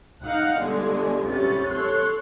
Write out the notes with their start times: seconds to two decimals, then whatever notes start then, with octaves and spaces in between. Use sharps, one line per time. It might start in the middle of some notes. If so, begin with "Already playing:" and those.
0.22 D#4 F5 F#5 F#6
0.60 G1 D3 G#3 D5
1.26 C3 B3 C#4 A6
1.69 A4 C#5 C6 F#6